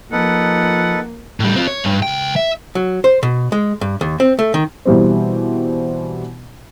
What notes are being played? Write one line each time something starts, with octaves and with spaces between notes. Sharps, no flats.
F3 A#3 D#4 A4 B4 F#5
A2 G3
C4 F4
C#5
G2
C#2 G5
E5
F#3
C5
B2
G#3
G2
D#2
C4
A3
D#3
B2 E3 G3 C4